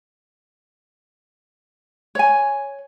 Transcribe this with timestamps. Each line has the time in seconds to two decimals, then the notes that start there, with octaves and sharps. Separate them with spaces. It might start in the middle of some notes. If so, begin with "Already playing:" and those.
2.15 C#5 G#5